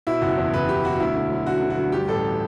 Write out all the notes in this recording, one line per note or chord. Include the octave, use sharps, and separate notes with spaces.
B2 E4
F#1 F#4
E2
F#1 B4
F#1 G4
B2 F#4
D2 E4
D3
F#3
D3 F#4
D3
F#4
D2
G2 G4
A1 A4